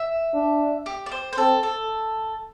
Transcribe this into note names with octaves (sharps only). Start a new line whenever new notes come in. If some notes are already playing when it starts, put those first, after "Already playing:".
Already playing: E5
D4
G4
D5
C5
C5
C4 A4
A4